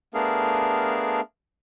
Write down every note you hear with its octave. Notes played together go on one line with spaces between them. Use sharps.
A3 B3 D4 G#4 A#4 F5